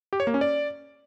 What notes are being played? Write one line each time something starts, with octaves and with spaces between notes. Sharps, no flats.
G4
C#5
A#3
C#4
D5